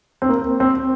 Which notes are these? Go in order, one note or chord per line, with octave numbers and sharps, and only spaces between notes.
C4
A#3
C4